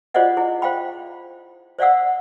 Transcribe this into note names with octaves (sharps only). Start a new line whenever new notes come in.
F4 G#4 C5 D5 D#5 F#5
E4 G#4
C5 F5 G5 B5
C5 D5 F5 F#5 E6